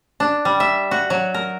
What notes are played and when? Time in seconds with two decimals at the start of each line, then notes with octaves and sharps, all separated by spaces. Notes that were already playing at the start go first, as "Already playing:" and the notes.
0.20 D4
0.45 G3
0.60 E5
0.91 F#4
1.10 F#3
1.34 A#4